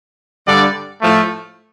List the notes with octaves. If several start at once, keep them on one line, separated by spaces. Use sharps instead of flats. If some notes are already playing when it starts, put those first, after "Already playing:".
G2 D3 G3 D5
A2 F3 A3